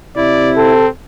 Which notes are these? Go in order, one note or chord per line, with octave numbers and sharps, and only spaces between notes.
C3 E4 D5
C4 A4